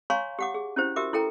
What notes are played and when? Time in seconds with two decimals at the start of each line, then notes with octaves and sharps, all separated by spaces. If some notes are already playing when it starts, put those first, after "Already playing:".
0.10 C#5 F5 G#5 A#5 C6 C#6
0.39 G4 F#5 D6
0.54 G#4
0.76 C#4 E4 G4 C5
0.96 F#4 G4 A#4 E5 D6
1.13 E4 A4 G5 A#5